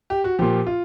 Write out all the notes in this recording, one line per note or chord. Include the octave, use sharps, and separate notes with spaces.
G4
F#4
A#2 F3 G4
F4